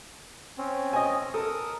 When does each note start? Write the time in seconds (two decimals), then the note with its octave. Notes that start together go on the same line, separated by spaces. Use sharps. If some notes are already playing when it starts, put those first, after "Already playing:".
0.58 C4 C#4
0.93 D#5 G#5
1.34 A4 A#4 D#6